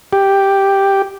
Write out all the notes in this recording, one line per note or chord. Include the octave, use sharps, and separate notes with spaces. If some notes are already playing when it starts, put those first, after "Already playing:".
G4